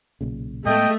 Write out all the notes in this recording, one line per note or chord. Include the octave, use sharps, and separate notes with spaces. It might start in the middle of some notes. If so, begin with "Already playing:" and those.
B1 A#2 C#3
A2 G#3 A3 B3 D#5 G5